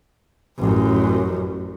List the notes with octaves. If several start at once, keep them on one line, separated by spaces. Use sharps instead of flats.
A1 F#2